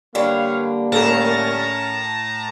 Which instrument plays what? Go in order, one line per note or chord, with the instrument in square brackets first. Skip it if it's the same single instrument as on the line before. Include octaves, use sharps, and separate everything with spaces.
[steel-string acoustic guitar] D3 G3 [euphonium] A#3 [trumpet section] B4 C#5 F5
[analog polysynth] A2 A5 A#5 [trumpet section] C#4 A#4